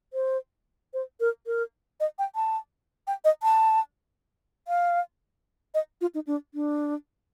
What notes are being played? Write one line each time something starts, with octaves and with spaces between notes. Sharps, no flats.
C5
C5
A#4
A#4
D#5
G5
A5
G5
D#5
A5
F5
D#5
F4
D#4
D4
D4